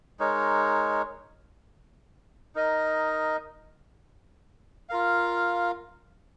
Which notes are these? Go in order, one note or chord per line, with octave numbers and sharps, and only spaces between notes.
G#3 D#4 A#4 C#5
D#4 A#4 D#5
F4 A#4 F5